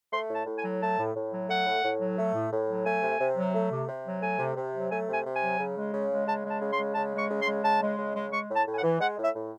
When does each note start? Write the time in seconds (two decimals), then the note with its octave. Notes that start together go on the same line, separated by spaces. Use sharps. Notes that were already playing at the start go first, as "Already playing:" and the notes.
0.11 A3 C6
0.29 A2 A5
0.45 A2
0.57 G#5
0.63 F#3
0.80 A3 A5
0.98 A2
1.15 A2
1.32 F#3
1.48 A3 F#5
1.65 A2
1.83 A2
2.00 F#3
2.17 A3
2.33 A2
2.51 A2
2.67 F#3
2.84 A3 G#5
3.02 C3
3.19 C3
3.36 F#3
3.54 A3
3.71 C3
3.87 C3
4.04 F#3
4.21 A3 G#5
4.38 C3
4.56 C3
4.73 F#3
4.90 A3 G#5
5.08 C3 G#5
5.25 C3
5.35 G#5
5.41 F#3
5.58 C#3
5.75 G#3
5.92 C#3
6.10 G#3
6.26 C#3 A5
6.43 G#3
6.49 A5
6.61 C#3
6.72 C6
6.78 G#3
6.94 C#3 A5
7.12 G#3
7.18 C#6
7.29 C#3
7.40 C6
7.46 G#3
7.63 C#3 A5
7.81 G#3
7.98 C#3
8.15 G#3
8.31 G#3 C#6
8.49 A2
8.54 A5
8.66 A2
8.72 G#5
8.77 F#5
8.82 E3
8.99 G#3 F#5
9.17 A2
9.22 E5
9.34 A2